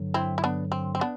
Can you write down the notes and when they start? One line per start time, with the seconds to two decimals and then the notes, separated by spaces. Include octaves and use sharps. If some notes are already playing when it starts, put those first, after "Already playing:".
Already playing: G2 D3 F#3
0.14 C4 E4
0.38 E4
0.44 B3 D4
0.72 C4
0.95 C4
1.01 B3 D4